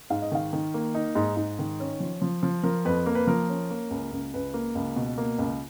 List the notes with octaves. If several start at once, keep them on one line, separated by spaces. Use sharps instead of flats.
G#2 F5
D#5
D#3 F5
D#3
A#3
D#4
G#2
G#2
D#3
C#4
F3
F3
F3
F3 A#4
F2 B4
A#3
B4
F3 A#4
C#4
A#3
C#2
C#2
C#2 B4
A#3
C#2
B2
A#3
C#2